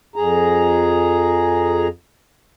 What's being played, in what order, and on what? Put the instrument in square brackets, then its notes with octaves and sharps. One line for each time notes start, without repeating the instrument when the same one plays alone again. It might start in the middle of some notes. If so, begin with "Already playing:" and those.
[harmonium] F2 G#4 A#5